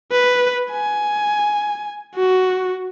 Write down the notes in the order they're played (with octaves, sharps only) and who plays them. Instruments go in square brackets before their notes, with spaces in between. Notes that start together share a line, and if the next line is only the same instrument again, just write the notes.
[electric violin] B4
G#5
F#4